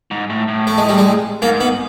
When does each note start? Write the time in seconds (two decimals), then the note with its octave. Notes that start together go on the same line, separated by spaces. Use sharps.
0.11 G#2
0.30 A2
0.48 A2
0.67 A3
0.78 G#3
0.89 G3
0.98 G#3
1.42 G#2 A#3
1.60 B3